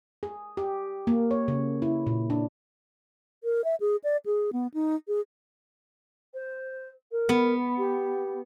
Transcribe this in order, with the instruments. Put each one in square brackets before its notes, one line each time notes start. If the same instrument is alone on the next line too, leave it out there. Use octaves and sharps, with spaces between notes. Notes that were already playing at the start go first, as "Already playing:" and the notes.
[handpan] G#4
G4
A#3
C#5
C#3
E4
A#2
D4
[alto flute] A#4
E5
G#4
D5
G#4
B3
D#4
G#4
C5
A#4
[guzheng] B3
[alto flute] G4